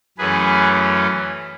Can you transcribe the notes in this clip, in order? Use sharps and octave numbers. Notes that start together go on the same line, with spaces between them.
F#2 E3 A3 C#4 G#4 B4